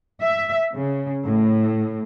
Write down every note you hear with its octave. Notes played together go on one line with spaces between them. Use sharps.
E5
C#3
A2